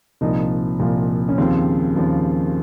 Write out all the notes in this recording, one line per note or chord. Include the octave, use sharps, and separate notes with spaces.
C2 A#2 F3 D#4
C2 A#2 F3
C#4
D#2 C#3 F3 C4
D#2 C#3 F3